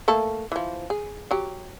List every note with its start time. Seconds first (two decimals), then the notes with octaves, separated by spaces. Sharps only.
0.08 A3 A#3 A4
0.52 E3 F3
0.90 G#4
1.31 F#3 G4